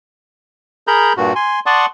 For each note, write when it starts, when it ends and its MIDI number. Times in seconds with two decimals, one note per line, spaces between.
0.87 1.13 68
0.87 1.13 70
0.87 1.13 82
0.87 1.13 83
0.87 1.13 91
1.17 1.33 43
1.17 1.33 46
1.17 1.33 66
1.36 1.60 80
1.36 1.60 84
1.66 1.86 74
1.66 1.86 78
1.66 1.86 81
1.66 1.86 84
1.66 1.86 85
1.66 1.86 87